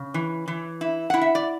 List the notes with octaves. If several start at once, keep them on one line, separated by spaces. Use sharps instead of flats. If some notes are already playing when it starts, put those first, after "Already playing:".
Already playing: C#3
E3
E3
E4
E4 F#5
E5
D5